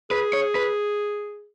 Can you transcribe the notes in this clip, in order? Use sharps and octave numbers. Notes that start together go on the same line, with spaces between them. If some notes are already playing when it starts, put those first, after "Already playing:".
G#4 B4
C#5
B4